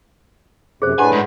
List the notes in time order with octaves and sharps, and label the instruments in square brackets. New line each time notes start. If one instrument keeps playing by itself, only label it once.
[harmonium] F#2 C3 [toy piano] G#4 C5
[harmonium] A2 D4 B4 [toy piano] G4 F#5 [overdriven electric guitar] G#5
[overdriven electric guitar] G#2